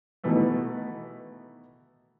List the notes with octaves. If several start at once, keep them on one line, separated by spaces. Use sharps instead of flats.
B2 D#3 E3 A3 B3